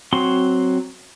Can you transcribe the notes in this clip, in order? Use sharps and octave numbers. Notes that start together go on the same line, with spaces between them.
F#3 C4 F#4 C6